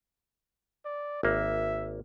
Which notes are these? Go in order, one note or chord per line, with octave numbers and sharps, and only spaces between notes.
D5
G#1 A#3 E5